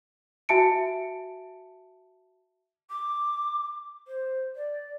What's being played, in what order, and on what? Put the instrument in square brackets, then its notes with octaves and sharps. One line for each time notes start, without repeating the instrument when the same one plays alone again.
[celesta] F#4 E5 G#5 A5 C#7 D7
[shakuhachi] D6
C5
D5